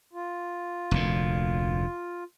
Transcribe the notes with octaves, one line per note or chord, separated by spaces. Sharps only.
F4
F1 D2 A#2